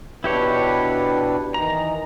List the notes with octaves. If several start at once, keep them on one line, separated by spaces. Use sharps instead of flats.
B2 D4 E4 G4 B4 C#5
D#3 E3 D#4 A#5